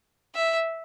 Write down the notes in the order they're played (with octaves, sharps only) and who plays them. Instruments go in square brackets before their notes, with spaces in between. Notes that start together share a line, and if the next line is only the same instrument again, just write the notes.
[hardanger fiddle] E5